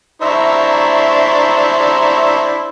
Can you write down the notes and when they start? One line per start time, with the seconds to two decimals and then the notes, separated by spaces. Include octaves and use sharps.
0.22 D4 E4 C5 E5 A#5 C#6